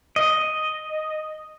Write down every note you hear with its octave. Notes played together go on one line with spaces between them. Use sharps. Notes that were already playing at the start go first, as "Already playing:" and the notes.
D#5